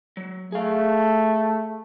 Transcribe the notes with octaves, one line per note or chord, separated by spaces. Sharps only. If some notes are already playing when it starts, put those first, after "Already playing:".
F#3
A3 G#4 F5